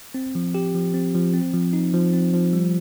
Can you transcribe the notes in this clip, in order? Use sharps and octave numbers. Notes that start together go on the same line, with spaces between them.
C4
F3
G4
F3
C4
F3
C4
F3
D#4
F3
C4
F3
G3